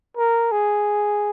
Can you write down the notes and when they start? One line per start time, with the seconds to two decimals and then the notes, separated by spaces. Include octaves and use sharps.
0.17 A#4
0.52 G#4